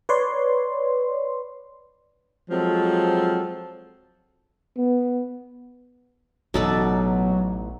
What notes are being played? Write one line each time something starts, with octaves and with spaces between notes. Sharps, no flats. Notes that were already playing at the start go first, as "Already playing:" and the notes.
B4 C#5 D5 C6
F3 F#3 G#3 C4 A4
B3
A1 B2 F#3 D#4 A4 D5